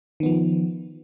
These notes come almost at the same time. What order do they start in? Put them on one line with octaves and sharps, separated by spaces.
D#3 B3 F3